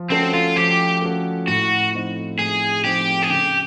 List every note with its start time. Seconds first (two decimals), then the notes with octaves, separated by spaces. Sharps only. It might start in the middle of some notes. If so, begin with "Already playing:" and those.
Already playing: F3
0.11 A3 C4 C#4 F#4 A4
0.34 F4
0.56 F3 G4
1.02 A3 C#4 F#4 A4
1.47 A2 F#4
1.93 F3 A3 C4 D#4
2.39 A2 G#4
2.84 F3 A3 C4 D#4 G4
3.23 G#4
3.29 C#3 G4